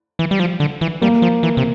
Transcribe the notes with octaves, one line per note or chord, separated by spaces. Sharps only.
E3
G3
F3
D3
E3
G3 A#3
F3
E3
C3